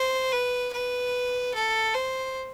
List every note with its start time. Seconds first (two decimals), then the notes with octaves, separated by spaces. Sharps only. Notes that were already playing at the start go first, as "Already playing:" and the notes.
Already playing: C5
0.32 B4
0.73 B4
1.54 A4
1.94 C5